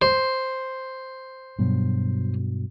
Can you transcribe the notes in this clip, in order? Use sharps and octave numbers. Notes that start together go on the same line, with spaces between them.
C5
G2 B2 F#3